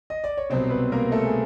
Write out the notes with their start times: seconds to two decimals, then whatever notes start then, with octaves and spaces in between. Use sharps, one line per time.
0.10 D#5
0.24 D5
0.37 C#5
0.50 C2 B2 F#3 C4 C5
0.70 B3 B4
0.92 A#3 A#4
1.12 A3 A4
1.25 G#4